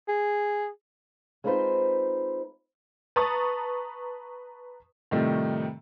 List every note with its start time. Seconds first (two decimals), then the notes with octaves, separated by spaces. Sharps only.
0.08 G#4
1.44 G#3 C4 D#4 F4 B4 C5
3.16 B4 A5 A#5 C#6 D#6 A6
5.11 A2 C3 D#3 F3 G3 A3